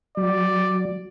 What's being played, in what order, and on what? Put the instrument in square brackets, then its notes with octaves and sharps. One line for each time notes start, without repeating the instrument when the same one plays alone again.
[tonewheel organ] F#3 [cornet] D5